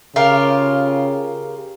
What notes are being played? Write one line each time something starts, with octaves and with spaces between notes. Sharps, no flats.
C#3 F4 G4 A#4